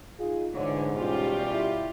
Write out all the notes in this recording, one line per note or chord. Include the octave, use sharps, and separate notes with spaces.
D#4 F4 G#4
D2 G#2 D3 E3 C#5
E2 B2 G3 C#4 F4 G4
E4